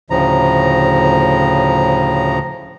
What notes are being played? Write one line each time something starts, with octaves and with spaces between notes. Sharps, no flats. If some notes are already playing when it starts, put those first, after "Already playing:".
D2 A2 C#3 F3 A#5